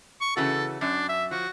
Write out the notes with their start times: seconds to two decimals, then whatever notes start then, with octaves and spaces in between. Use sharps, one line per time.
0.21 C#6
0.37 C#3 E3 F#4 A4
0.81 F#2 D4
1.09 E5
1.31 F3 F#4